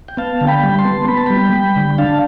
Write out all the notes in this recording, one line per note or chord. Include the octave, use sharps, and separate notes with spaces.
G5
B3 F5 A5
D3
G5 B5
G3
A5 C6
B3
B3 B5
A5
G3 G5 B5
G3
D3
D4 F5 A5